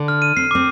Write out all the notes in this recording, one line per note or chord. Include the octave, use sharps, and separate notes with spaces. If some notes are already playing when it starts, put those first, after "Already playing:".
Already playing: D3
F6
D#7
C4 C7
C4 D6